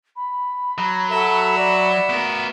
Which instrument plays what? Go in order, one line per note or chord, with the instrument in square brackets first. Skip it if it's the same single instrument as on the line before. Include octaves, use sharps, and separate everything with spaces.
[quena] B5
[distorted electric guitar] F#3
[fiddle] F#4 E5 [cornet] A4
[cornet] D5
[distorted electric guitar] B3 A#4